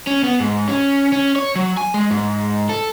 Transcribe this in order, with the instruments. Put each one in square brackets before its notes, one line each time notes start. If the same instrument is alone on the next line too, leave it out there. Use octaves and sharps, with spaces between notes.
[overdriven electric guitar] C#4
B3
G#2
C#4
C#4
C#5
F#3
G#5
G#3
G#2
A4